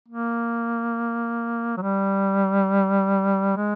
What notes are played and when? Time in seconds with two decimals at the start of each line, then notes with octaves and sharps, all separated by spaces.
0.08 A#3
1.77 F#3
1.82 G3
3.57 G#3